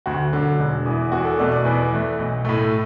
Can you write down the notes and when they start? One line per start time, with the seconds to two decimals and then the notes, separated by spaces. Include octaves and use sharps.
0.06 D2 F#4
0.33 D3 F#3
0.60 E1
0.86 E2 E3
1.12 E2 F#4
1.25 A4
1.39 B2 A3 D5
1.52 D5
1.65 E2 B4
1.92 E3 A3
2.19 B1
2.45 A2 A3